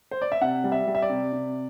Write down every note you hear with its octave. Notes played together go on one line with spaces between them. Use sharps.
C5
D5
E5
C3 F#5
G3
E5
G3
E5
D5
C3
C3